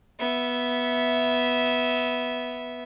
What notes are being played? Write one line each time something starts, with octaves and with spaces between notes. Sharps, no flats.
B3 E5